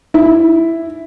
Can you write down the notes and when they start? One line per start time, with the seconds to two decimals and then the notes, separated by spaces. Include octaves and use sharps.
0.14 E4